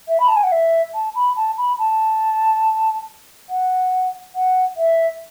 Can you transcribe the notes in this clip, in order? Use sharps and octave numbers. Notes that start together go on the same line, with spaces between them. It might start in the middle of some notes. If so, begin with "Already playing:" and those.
E5
B5
A5
G#5
F#5
E5
A5
B5
A5
B5
A5
F#5
F#5
E5